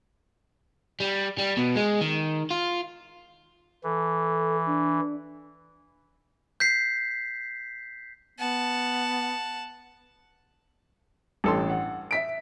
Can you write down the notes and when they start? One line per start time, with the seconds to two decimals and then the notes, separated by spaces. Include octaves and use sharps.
1.00 G3
1.38 G3
1.57 B2
1.76 G#3
2.01 D#3
2.50 F4
3.84 E3 A4
4.67 D4
6.60 G6 B6 C7
8.39 B3 F#5 A5
11.44 A1 G2 A4 C6
11.70 F#5
12.11 E5 B6 D7